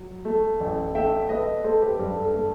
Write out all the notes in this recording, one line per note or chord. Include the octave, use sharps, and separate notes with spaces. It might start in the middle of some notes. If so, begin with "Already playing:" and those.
Already playing: F#3
A3
A1
A3 E5 G5
A3 B4 D#5
A3 A4 C5
G4 B4
G2
A4
A3